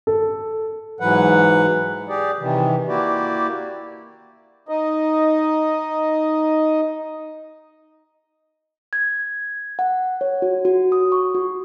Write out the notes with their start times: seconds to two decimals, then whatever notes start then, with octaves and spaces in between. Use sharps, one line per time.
0.07 A4
1.00 G#2 E3 F#3 B4 F#5
2.09 G4 G#4 D5
2.40 C3 D#3 E3
2.88 A#3 E4 F#4 G4 D5
4.69 D#4 D#5
8.93 G#6
9.79 F#5
10.21 C#5
10.42 F#4
10.65 F#4
10.92 D#6
11.12 C#6
11.35 F#4